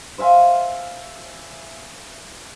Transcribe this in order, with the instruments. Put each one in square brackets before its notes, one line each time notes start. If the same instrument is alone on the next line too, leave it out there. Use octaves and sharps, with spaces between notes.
[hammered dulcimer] C5 E5 F5 G#5